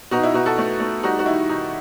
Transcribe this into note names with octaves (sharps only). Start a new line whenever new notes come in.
B2 D#4 F#4
E4
B2 D#4 F#4
F#4 A4
A3
A3
G3 D#4 F#4
F#4
D#3 E4
D#3 D#4